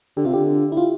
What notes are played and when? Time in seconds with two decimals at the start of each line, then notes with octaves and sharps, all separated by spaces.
0.17 D3 G4
0.25 C3 F4
0.34 D3 G4
0.72 E4
0.77 F4